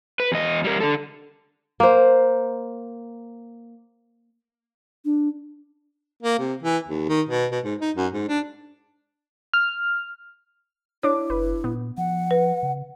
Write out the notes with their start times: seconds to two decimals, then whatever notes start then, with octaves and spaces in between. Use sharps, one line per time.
0.20 B4
0.32 E2 D#5
0.64 G3 A#4
0.80 D3 A4
1.80 A#3 C5
5.05 D4
6.22 A#3
6.39 C3
6.63 E3
6.87 D#2
7.08 D#3
7.29 B2
7.51 B2
7.64 G#2
7.81 D#4
7.96 F#2
8.13 G#2
8.28 D4
9.54 F6
11.03 D4 E4 C#5 D6
11.30 F#1 B4
11.64 A#2 B3
11.98 F3 F#5
12.31 B4
12.63 C#3